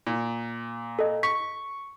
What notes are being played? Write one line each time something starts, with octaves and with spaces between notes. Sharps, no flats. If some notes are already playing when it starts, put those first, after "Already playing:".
A#2
A4 D#5
C#6 B6